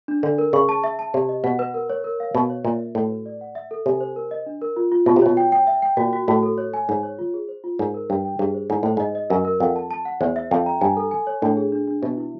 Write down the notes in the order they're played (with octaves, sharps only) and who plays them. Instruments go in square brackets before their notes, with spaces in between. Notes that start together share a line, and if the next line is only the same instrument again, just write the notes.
[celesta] D4
[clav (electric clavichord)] D3 [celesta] D4
[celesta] A#4
[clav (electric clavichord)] C#3 [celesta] C#6
[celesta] A5
E5
A5
[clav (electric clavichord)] C3 [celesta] G4
[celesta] D#5
[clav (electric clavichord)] B2 [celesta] F#5
[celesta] B4
A#4
C#5
A#4
F5
[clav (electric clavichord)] B2 [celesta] C#5
[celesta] C#5
[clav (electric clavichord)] A#2 [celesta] E5
[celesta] E5
[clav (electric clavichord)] A2 [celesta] F#4
[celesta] B4
D5
F#5
E5
A4
[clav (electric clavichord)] C3 [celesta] G#5
[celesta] C5
A#4
D#5
D4
A#4
F4
F4
[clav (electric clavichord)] B2 [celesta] F4
[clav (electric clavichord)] C3
[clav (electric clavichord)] B2 [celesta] C#5
[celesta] G5
G5
E5
G5
[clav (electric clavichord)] A#2 [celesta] F#4
[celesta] F#4
[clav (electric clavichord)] A2 [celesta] F#4
[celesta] A4
C#5
G#5
[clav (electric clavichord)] G#2 [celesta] C#5
[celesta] C#5
F4
G#4
C5
F4
[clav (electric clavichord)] G#2 [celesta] A#4
[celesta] A#4
[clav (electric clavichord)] G2 [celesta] G5
[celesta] G5
[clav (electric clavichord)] G2 [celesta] G#4
[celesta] C5
[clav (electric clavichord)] G#2 [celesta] E4
[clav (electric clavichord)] A2 [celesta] C5
[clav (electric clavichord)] G#2 [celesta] D#5
[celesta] D#5
[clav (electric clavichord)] F#2 [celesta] A#4
[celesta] A#4
[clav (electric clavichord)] F2 [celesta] F#5
[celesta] A5
A5
F#5
[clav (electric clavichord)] E2 [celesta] C5
[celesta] E5
[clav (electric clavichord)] F2 [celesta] G5
[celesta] A#5
[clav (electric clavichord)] G2 [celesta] G#5
[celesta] A4
G#5
C#5
[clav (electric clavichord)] A2 [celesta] D4
[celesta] G#4
D4
D4
[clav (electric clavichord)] B2 [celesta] E5
[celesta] E4